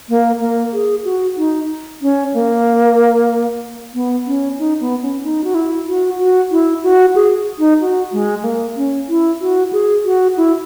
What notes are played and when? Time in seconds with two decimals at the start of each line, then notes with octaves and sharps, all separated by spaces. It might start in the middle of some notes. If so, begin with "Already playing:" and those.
0.09 A#3
0.40 A#3
0.73 G#4
1.05 F#4
1.37 D#4
2.02 C#4
2.34 A#3
3.94 B3
4.27 C#4
4.59 D#4
4.80 B3
5.02 C#4
5.23 D#4
5.44 F#4
5.55 E4
5.88 F#4
6.19 F#4
6.51 E4
6.83 F#4
7.15 G#4
7.59 D#4
7.81 F#4
8.12 G#3
8.40 G#3
8.44 A#3
8.76 C#4
9.09 E4
9.41 F#4
9.73 G#4
10.05 F#4
10.37 E4